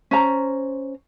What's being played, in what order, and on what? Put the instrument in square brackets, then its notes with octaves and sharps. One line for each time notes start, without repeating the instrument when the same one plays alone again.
[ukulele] C#4 C5 A#5